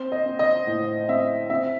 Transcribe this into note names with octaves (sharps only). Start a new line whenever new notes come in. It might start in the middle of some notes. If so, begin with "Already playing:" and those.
Already playing: C4 C5
D#5
C4
D#5
A2
C4 E5
C4 E5